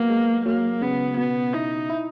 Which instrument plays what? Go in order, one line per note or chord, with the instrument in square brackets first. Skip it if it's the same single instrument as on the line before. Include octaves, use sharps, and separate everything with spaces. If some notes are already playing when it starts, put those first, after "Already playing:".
Already playing: [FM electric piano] F#3 B3 [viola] A#3
[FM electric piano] G#3
[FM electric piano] F#3 [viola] A#3
[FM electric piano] C#3 [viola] B3
[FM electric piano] B2 [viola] B3
[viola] D#4 [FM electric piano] E4
[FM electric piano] E4